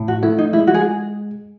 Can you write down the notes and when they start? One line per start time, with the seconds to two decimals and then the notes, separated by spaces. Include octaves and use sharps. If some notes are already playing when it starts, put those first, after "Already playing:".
Already playing: A2
0.08 F#4
0.23 A3 E4
0.38 D#4
0.53 G#3 E4
0.67 F#4
0.74 G#4